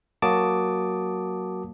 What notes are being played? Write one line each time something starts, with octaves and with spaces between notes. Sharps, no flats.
F#3 A#3 F#4 A5 D6 D#6